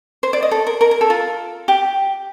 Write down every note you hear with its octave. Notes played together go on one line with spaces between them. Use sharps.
C5
D5
D#5
A4
A#4
A#4
A#4
A4
F4
G4